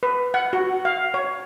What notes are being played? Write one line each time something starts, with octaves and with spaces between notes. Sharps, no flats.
B4
F#5
F#4
F5
C#5